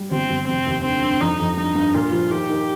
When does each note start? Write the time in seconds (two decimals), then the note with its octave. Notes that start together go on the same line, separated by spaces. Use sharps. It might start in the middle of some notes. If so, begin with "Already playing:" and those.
Already playing: G3
0.11 G1 C4
0.30 G1
0.48 F1 C4
0.66 D#2
0.84 D3 C4
1.03 G2
1.21 F2 D#4
1.39 F2
1.57 G2 D#4
1.75 G2
1.94 A#2 F4
2.13 F3
2.31 D#3 G4
2.49 D#3